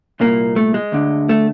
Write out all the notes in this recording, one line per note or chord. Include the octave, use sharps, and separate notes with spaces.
C2 A#2 A#3
A3
G#3
D2 D3
A3